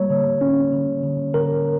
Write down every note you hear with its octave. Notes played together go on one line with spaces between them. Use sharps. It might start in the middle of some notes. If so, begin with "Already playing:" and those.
Already playing: G3 A#3 C#5
D3
C#4
D3
D3
D3 A#4